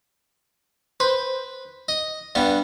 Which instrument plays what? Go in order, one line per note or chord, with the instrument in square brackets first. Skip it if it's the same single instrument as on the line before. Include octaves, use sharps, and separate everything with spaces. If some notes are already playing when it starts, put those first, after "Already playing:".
[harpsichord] B4 [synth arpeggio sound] C5
[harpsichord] D#5
G2 G3 B3